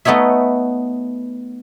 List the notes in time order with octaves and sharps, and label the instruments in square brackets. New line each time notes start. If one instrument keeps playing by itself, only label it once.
[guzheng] A3 B3 D#4 C#5 E5